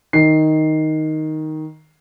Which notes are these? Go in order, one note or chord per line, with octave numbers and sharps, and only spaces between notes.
D#3 C7